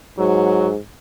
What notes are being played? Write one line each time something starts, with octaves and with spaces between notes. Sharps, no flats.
G#2 F#3